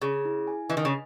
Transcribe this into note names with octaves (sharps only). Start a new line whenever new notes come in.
C#3 G#4
E4
G#5
E3 D#5
D#3
C#3